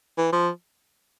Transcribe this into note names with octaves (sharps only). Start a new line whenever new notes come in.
E3
F3